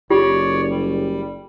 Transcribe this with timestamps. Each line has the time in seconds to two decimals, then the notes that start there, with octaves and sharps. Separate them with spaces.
0.10 F#1 F4 G4 C#5 D5
0.70 G3